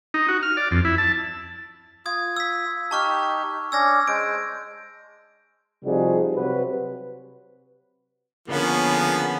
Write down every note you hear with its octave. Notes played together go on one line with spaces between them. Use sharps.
D#4
F#4
F6
D5
F2
E4
A5
F4 D#6 G#6
E6 B6
D#4 G4 A5 C#6 F6
C#4 D4 E6 G#6 A#6
G#3 C5 D7
C3 F3 G3 D#4 F#4 G#4
C3 F#3 F#4 B4
D3 F3 A#3 B3 C#4 G#4